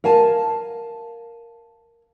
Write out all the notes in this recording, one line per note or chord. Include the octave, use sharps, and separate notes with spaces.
A#4 F5 G#5 A5